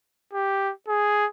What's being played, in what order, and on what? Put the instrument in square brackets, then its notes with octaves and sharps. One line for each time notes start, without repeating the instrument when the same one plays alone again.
[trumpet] G4
G#4